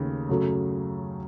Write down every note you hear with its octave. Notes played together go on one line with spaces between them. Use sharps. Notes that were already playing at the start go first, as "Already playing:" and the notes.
Already playing: D#2 C#3 A3
F#2 C#3 F#3 A3